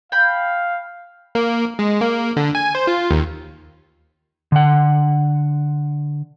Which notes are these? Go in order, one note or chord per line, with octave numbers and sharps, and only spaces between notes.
F5 G5 B5
A#3
G#3
A#3
D3
G#5
C5
F4
D#2
D3 F#5